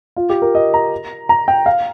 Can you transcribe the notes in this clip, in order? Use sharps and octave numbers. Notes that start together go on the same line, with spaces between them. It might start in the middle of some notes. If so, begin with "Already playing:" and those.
F4
G4
A#4
D#5
A#5
A#5
G5
F5